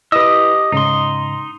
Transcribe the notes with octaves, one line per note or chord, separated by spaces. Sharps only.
E4 G4 B4 D#5 D#6 E6
G#2 C#3 D#4 C6